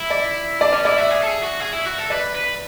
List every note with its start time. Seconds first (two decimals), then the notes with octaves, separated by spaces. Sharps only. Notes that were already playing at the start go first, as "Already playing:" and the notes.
Already playing: E4
0.10 D5
0.60 D4 D5
0.73 C#4 D5
0.85 E4 D5
0.98 F#4 E5
1.11 G#4
1.23 A4
1.28 G#4
1.43 F#4
1.60 G#4
1.73 E4
1.85 F#4
1.98 A4
2.10 B4 D5
2.35 B4